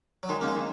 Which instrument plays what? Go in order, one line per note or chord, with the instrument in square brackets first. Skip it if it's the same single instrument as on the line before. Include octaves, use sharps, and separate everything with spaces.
[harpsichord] F#3
[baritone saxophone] D#3 [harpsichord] G#3
[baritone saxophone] C#3 [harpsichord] A#3
[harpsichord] G#3
[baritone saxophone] D#3